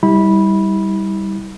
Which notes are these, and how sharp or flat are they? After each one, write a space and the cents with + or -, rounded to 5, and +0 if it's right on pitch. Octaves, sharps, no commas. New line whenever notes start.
G3 +0 E4 -40 B5 -10